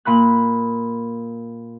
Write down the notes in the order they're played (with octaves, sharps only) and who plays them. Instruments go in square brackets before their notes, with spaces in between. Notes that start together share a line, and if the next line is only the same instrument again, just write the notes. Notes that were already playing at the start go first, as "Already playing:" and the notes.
[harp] A#2 B5 F#6